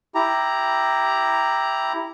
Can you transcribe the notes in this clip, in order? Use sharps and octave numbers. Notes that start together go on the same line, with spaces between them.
E4 G4 A#5